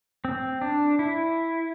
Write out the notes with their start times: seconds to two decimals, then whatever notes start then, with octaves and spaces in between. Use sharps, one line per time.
0.25 C4
0.61 D4
0.99 E4